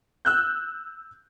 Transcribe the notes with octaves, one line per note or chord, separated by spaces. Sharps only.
E6 F#6 G6